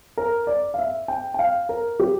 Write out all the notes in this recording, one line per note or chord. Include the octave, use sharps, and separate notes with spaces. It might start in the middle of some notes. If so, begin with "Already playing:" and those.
A#4
D5
F5
E5
G5
G5
F5
A#4
G4